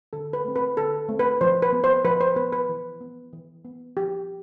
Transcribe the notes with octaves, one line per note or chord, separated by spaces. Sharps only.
D3 A4
B4
A3 C4
B4
D3 A4
A3 C4
B4
F3 C5
B4
B3
C5
F3 B4
C5
B3 B4
B4
E3
B3
E3
B3
F3 G4